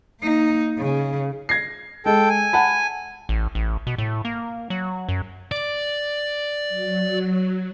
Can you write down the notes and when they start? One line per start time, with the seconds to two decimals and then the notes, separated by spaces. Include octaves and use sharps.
0.21 A#3 D#4
0.79 C#3
1.49 G#6 A#6 C7
2.06 G#3 A4 G5
2.29 G#5
2.53 F#5 A5 B5
3.29 A1
3.55 A1
3.87 B2
3.98 A2
4.25 A#3
4.70 F#3
5.09 F#2
5.52 D5
6.69 F#3